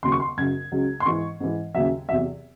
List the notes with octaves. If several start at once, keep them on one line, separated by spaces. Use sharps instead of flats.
D#2 C#3 F#3 C6
C#6
C6
F#2 C#3 F#3 G#6
C#2 C#3 F#3
C6
G#2 E3 C#6
G#2 E3
D#2 C#3 F#3 E5
E2 C3 F#3 E5